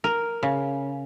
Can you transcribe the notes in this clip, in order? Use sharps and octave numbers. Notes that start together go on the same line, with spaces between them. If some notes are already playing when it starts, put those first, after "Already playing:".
A#4
C#3